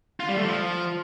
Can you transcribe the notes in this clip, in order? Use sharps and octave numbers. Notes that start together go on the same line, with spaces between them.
F4
G3
A3
F3